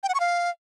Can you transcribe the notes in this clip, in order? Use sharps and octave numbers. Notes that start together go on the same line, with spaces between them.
G5
F#5
C#6
F5